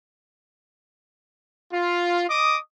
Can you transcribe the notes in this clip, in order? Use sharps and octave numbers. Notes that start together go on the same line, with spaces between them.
F4
D#5 D6 D#6